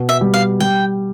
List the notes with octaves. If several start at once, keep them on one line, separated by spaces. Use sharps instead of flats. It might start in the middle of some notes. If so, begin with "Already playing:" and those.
Already playing: B2
E5
G3
F5
G3 G5